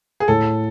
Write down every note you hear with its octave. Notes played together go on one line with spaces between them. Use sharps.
G#4
A2 A4